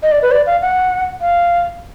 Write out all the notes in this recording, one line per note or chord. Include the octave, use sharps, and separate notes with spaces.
D#5
D5
B4
D5
F5
F#5
F5